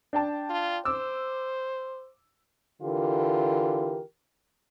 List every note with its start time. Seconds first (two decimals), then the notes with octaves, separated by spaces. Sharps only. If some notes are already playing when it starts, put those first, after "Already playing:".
0.13 D4 G5 A5
0.50 F4
0.85 C5 D6 E6
2.82 D3 E3 F4 G4 A#4